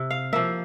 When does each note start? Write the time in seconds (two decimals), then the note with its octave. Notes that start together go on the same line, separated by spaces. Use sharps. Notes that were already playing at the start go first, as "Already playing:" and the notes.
Already playing: C3
0.10 F5
0.33 F3 A#3 E5